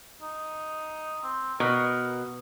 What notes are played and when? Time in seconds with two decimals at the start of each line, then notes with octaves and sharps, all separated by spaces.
0.22 D#4
1.23 C4
1.60 B2 A#4